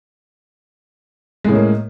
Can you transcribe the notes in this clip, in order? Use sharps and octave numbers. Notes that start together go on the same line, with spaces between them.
A2 G#3 A#3 C#4